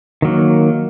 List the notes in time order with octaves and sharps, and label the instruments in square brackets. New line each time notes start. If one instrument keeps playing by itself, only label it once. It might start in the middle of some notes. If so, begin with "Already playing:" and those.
[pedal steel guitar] D#3 F#3 A#3